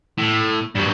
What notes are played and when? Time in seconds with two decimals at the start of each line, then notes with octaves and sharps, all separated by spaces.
0.18 A2
0.75 G2 F#3